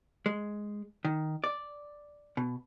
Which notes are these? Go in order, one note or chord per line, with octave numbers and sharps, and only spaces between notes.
G#3
D#3
D5
B2